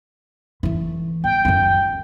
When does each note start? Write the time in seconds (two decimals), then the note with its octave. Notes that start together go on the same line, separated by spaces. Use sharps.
0.63 E3 A3
1.24 G1 G5
1.45 F#2 A3